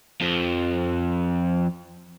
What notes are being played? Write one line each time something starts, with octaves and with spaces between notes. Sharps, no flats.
F2 F3